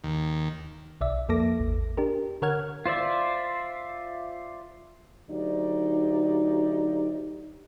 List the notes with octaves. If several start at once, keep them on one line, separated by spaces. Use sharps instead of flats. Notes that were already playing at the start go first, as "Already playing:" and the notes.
D#2
B1 D5 E5
F2 F3 A#3 A4 D6 A#6
A1 E2
D4 G4 A#4
D3 A#4 C#5 F#5 F6 G#6
F4 C5 D5 E5
D2 F#3 D#4 G4 D5